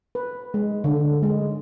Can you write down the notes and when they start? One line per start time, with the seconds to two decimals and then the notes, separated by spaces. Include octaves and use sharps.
0.15 B4
0.54 G#3
0.84 D3
1.23 G#3